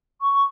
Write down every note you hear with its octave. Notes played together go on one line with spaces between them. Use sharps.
C#6